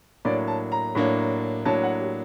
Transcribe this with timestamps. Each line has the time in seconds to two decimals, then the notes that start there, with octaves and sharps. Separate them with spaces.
0.25 A2 F#3 A#3 D4 D5
0.48 A5
0.72 A#5
0.95 A2 F#3 A#3 D4
1.65 A2 F#3 A#3 D4 A5
1.83 F#5
2.01 G4